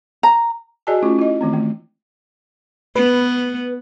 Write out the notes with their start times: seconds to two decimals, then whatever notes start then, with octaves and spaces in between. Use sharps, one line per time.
0.23 A#5
0.87 F#4 G#4 D5 D#5 G#5 A5
1.02 A3 C#4 D#4 F4
1.19 E4 D#5
1.41 D#3 E3 A3 C4
1.53 A3
2.96 B3 B4